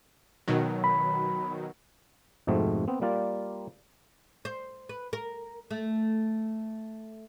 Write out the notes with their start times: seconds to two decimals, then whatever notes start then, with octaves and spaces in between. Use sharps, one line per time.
0.48 B2 D#3 F#3
0.84 B5
2.47 F2 G#2 B2 A3 B3 C4
2.88 B3 C4
3.02 G3 A#3 F4 D5
4.45 C5
4.89 B4
5.13 A#4
5.71 A3